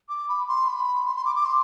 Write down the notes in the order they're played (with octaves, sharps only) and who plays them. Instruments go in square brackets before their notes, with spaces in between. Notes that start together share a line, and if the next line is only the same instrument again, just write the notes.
[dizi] D6
B5
C6
B5
C6
C6
D6
D6
C6